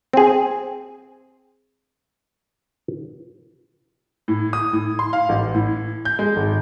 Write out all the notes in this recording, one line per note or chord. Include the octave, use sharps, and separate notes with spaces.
C4 G#4
A2
D#6
A2
C6
F5
A1
A2
G6
G#3
G#1